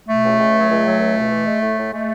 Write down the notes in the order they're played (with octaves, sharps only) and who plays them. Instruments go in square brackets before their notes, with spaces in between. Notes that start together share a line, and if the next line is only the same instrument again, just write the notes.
[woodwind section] B2 A3
C#2
C#2
F#3
C#2
F#3
C#2
B2
E3
G#3
A2
A2
G#3 A3